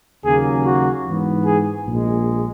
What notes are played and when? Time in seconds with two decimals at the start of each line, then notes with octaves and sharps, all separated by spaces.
0.25 D#2 C#3 F#3 A#3 G#4
0.66 F#4
1.06 G#2 E3 B3
1.46 G#4
1.87 A#1 A#2 G#3